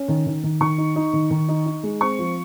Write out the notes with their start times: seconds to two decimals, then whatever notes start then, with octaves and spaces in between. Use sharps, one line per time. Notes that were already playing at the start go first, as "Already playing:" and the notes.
Already playing: C#4
0.08 D#3
0.26 D#3
0.43 D#3
0.60 D#3 C#6
0.78 D#4
0.96 D#4
1.13 D#3
1.30 D#3
1.49 D#4
1.66 D#4
1.83 G#3
2.01 C4 C#6
2.19 F3